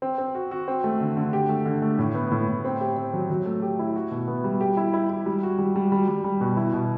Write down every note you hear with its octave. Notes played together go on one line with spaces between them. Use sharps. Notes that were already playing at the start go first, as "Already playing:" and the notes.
C4
C4
F#4
F#4
C4
A3
D3
D3
G4
A3
D3
A3
A2
B3
A2
A2
C4
G4
C4
F#3
F#3
A3
G4
E4
F#4
B2
B3
G3
G4
E4
E4
E4
G3
F#4
G3
G3
G3
G3
G3
B2
E4
B2